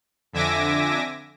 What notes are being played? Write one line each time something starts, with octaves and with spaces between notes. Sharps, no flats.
F2 D3 E5 G#5 D6 A#6